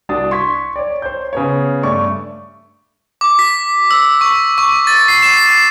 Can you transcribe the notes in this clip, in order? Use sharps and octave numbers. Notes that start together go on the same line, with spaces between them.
C2 D4 F#4 D#6 A6
C6 C#6 G#6 B6
C#5 D5
C5 C#5 G6
C#3 B3 C#5
G2 A3 D5 C#6
D6
B6
E6
C#6
C#6
A6
C7
E7
C7